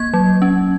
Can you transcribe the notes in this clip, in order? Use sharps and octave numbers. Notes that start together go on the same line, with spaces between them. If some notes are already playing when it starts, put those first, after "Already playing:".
Already playing: A#3 G#6
F#3
C#4